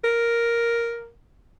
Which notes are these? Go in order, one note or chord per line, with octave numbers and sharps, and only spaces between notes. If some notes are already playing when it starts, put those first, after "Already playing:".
A#4